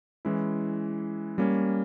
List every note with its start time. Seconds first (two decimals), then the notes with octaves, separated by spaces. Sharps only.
0.25 E3 G#3 C#4 E4
1.38 G3 A#3 C#4